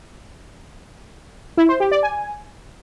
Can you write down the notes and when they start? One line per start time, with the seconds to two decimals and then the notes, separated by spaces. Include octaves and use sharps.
1.57 E4
1.69 C5
1.80 G4
1.92 D5
2.03 G#5